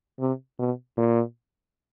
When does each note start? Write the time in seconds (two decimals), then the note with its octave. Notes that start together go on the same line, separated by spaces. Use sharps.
0.20 C3
0.59 B2
0.97 A#2